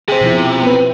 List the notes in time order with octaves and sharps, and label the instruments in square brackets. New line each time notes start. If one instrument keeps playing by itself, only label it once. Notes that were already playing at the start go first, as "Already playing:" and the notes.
[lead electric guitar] C3 [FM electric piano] G#4 C5
[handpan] B2 F3 E4
[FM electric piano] B3 B4